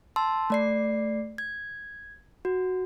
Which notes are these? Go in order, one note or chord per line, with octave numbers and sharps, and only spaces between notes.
A5 C6 E6
A3 D5 C7
G#6
F#4